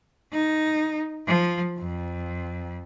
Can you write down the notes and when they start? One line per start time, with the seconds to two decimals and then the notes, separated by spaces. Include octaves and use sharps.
0.32 D#4
1.27 F3
1.78 F2